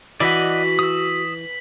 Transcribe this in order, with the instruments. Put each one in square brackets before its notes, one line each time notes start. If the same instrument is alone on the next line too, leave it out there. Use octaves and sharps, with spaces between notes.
[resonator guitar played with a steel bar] E3 [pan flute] F#4 [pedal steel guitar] D5 D#5 F#5 [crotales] B6 F#7
[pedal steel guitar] D#6 E6